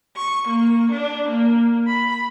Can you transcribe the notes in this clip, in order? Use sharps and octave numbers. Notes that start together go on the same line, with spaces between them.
C#6
A#3
D4
A#3
B5